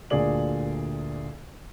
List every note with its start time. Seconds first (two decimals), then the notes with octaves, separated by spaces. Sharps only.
0.10 D2 A#2 D3 G#4 D5 F#7